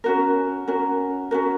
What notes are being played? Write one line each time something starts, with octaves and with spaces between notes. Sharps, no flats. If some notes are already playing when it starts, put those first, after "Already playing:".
C#4 F#4 A#4
C#4 F#4 A#4
C#4 F#4 A#4